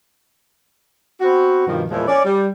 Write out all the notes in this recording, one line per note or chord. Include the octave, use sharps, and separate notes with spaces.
B3 C4 F#4
G2 B2 D#3 F3
E2 A#2 F3 G#3 E4
C#4 D5
G3